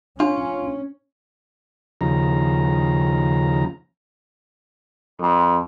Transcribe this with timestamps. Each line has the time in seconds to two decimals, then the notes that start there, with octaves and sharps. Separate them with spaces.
0.20 C#4 D4 F4
2.01 D#2 C#3 F3 A#5
5.20 F2